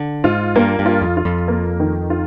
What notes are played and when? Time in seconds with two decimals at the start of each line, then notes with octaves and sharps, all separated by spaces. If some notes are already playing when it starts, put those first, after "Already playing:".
Already playing: D3
0.24 G#2 F4
0.56 G2 A#3
0.79 G2
0.86 F4
1.02 F2
1.17 F4
1.25 F2
1.48 A#3
1.80 D#3
2.10 F4